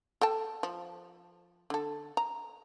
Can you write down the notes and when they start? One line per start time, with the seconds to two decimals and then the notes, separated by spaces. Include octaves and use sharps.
0.21 A4 G5 A5
0.63 F3
1.70 D3 A4
2.17 A#5